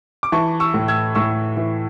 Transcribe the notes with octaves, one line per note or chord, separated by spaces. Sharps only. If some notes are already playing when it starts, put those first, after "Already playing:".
D6
E3 A5 C#6
C#6 E6
A2
E6 G#6
A2 C#6 E6
E3